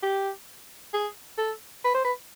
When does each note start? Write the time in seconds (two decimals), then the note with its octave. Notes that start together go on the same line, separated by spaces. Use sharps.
0.03 G4
0.94 G#4
1.38 A4
1.84 B4
1.94 C5
2.05 B4